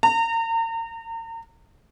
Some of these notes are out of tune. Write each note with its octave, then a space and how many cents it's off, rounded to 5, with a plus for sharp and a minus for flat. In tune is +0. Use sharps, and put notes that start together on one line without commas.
A#5 -40